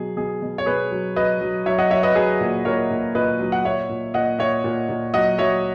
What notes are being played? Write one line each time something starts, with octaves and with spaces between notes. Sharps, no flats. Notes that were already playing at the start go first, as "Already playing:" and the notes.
Already playing: B2 F#3 G#4
B2 G#4
B2
C#5
B2 G#4 B4
F#3
F#3 B4 D#5
F#3
F#3 C#5 E5
D#5 F#5
F#3 C#5 E5
B4 D#5
F#3 G#4 B4
A#2
A#2 A#4 C#5
A#2
A#2 B4 D#5
F#3
F#5
A#2 C#5 E5
A#2
A#2 D#5 F#5
A#2 C#5 E5
A#2
A#2
F#3 D#5 F#5
F#3 C#5 E5